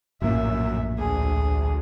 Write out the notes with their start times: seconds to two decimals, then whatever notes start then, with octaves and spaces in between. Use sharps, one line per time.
0.22 A#1 F#2 A2 A#3 E5
0.98 D2 G#4